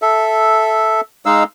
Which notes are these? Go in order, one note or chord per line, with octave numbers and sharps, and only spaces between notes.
A4 E5
G#3 D#4 F5 E6